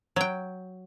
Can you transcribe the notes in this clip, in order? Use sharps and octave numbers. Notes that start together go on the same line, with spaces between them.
F#3 G5